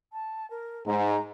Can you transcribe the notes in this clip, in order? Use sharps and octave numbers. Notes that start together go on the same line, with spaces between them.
A5
A#4
G#2 A#5